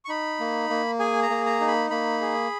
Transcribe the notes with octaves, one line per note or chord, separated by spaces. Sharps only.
C#6
D#4 B5
A#3
A#3
G#4 G#5
A#5
A#3
A#5
D#4
B5
A#3 B5
G#4